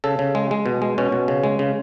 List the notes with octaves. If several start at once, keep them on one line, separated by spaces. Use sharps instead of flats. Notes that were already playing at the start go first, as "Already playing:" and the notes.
C#3 A4
C#3
G#3
G#3
B2
G#3
B2 C#4
B2
C#3
G#3
C#3